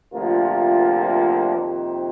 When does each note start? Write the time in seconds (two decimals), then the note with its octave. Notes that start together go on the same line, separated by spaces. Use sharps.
0.13 D2 C3 F3 A#3 F4
1.54 F2 C3 D#3 A#3 C5